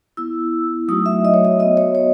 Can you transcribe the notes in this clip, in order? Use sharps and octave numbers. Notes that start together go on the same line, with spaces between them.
B3 E4 E6
F#3 A3 D#4 F#4 D#6
E5
D#5
C#5
D#5
B3 F#4 D#5
C#5
C#5